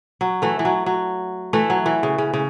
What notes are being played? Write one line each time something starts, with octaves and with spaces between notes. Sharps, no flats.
F#3
E3 A3
E3
F#3
F#3
E3 A3
F#3
E3
C#3
C#3
C#3